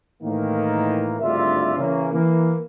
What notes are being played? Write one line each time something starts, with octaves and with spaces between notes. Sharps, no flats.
A2 D#3 E3 A#3
G#1 D2 G2 F4 D5 E5
C#3 E3 A#3 C#4
E3 A#3